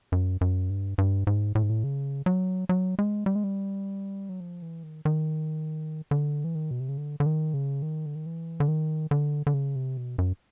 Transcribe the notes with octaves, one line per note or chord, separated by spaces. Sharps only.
F#2
F#2
G2
G2
G#2
A2
G#2
A2
C#3
F#3
F#3
G#3
G3
G#3
G3
F#3
F3
E3
D#3
D#3
D3
E3
D#3
B2
C3
C#3
D3
D3
D#3
C#3
D#3
D3
D#3
E3
D3
D#3
D3
D3
C#3
C3
B2
F#2